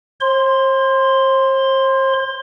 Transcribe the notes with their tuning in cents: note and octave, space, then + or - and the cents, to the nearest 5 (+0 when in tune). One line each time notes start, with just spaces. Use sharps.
C5 +40 C6 +0